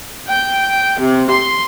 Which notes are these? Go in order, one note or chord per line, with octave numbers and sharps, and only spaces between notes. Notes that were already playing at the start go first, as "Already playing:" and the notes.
G5
C3
C6